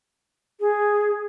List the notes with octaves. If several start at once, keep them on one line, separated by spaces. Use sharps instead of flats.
G#4